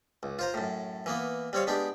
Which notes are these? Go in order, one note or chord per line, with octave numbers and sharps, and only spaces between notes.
C#2
F4 C5 A#5
F#2 A2
E3 A#3 B3
G3 C4 C#5 F5
G#3 B3 D4 G4